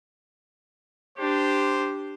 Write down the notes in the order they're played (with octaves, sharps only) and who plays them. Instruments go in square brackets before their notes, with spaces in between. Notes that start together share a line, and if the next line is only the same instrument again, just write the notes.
[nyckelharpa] D4 G4 [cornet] C5